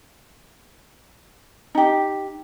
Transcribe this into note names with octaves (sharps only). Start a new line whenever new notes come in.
D#4 G4